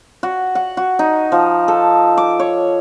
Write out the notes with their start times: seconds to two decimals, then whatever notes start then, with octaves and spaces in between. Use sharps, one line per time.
0.23 F#4
0.55 F#5
0.77 F#4
0.99 D#4
1.32 F3
1.68 A4
2.17 D6
2.40 C#5